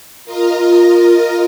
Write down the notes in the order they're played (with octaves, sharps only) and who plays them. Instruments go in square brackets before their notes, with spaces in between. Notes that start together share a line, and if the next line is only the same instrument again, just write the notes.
[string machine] F4 A#4 D#5